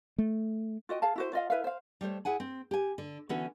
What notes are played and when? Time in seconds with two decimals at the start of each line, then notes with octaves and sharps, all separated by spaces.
0.18 A3
0.89 F4 F#4 D#5 G5
1.02 G#4 F5 A5
1.16 E4 F#4 C5
1.33 F4 D#5 F5
1.50 E4 B4 E5 F5
1.64 C5 F5
2.01 G3 A3 C5 C#5
2.25 E4 G#4 F#5 G#5
2.40 C4
2.71 G4 G#5
2.98 D3
3.29 D3 E3 B3 C#4 F#4